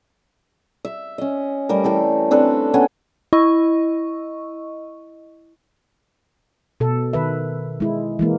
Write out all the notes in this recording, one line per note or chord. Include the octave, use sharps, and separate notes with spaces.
E5
C#4 D#5
G3 A3 A#4
E3 A4 G5
C4 D4 A4 B4
B3 C#4 A4 G#5
E4 D#5 C#6
B2 A4
D#3 B4 E5
G#3 E4
E3 G#3 A#3